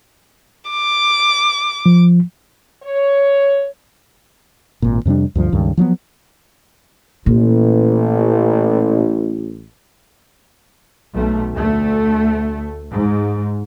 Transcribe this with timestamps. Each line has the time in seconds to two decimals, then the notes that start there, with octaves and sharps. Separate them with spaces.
0.70 D6
1.86 F3
2.83 C#5
4.82 G#1 A#2
5.05 F2 C3 G3 D4
5.35 D2 G2 F3
5.52 C#2 G2 D#3
5.77 F3 F#3 A#3 B3
7.26 A1 A#2
11.14 B1 A3
11.52 D2 A3
12.91 G#2